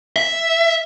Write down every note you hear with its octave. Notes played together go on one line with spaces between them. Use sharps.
E5